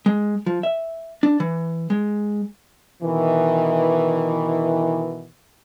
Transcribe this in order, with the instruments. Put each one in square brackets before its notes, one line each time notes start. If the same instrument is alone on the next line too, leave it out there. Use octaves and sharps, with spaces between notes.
[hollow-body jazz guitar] G#3
F3
E5
D4
E3
G#3
[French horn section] B2 D#3 E3